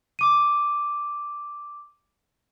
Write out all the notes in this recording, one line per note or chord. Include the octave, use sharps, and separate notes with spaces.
D6 D#7